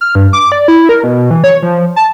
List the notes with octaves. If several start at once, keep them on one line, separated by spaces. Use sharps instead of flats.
F6
G2
D6
D5
E4
A#4
B2
E3
C#5
F3
A5